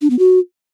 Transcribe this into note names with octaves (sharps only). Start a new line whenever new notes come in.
D4
B3
F#4